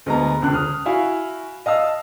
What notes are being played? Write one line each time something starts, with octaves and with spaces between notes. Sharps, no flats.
D2 G#3 B3 A#5
E1 C#2 D3 F#6
D#6 F6
E4 F#4 F5 G#5
D#5 F5 A5 E6